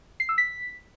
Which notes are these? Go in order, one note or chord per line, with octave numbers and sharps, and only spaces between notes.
C7
E6
B6